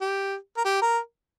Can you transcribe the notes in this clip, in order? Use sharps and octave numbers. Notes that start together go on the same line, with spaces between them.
G4
A#4
G4
A#4